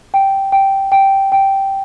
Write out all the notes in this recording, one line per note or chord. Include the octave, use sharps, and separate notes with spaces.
G5
G5
G5
G5